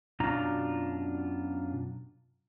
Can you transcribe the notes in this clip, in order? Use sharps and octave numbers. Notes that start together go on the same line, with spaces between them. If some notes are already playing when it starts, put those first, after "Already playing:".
F#2 B2 D4 F4 A#5